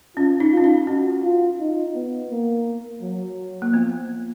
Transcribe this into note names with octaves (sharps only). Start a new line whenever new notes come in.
C#4 F4
D#4
F4
C#4
D#4
C#4 F#4
F4
D#4
B3
A#3
F#3
A#3
F3 B3